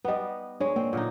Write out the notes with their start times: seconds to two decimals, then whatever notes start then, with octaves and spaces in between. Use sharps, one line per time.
0.05 G3 B3 B4 D#5
0.60 G#3 D4 C#5
0.76 A#3 C4
0.93 A#2 D3 D#4